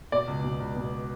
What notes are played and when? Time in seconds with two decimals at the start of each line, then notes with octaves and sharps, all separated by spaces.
0.12 B2 D5
0.28 C#2
0.44 B2
0.60 C#2
0.77 B2